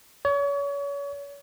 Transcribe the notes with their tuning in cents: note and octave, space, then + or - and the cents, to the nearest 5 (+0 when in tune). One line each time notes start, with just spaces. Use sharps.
C#5 +35